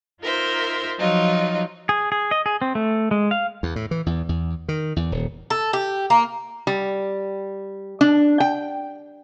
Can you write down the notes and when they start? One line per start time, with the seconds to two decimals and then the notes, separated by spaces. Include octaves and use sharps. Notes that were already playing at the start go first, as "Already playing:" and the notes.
0.21 D#4 F4 A#4 C5 E5
0.99 F3 F#3 D#4 F4
1.89 G#4
2.12 G#4
2.31 D#5
2.46 G#4
2.62 C4
2.75 A3
3.11 G#3
3.31 F5
3.63 E2
3.76 A2
3.91 E3
4.06 E2
4.29 E2
4.69 D#3
4.96 E2
5.12 D#1
5.50 A4
5.73 G4
6.10 A#3
6.67 G3
8.01 D4
8.40 G5